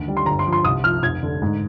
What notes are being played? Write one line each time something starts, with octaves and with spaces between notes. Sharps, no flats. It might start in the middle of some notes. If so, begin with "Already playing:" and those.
Already playing: D2 D#3
G3
C6
G1 A#5
C6
F3
C6
C2 D#6
F3 F6
F1 G#6
D3
G#2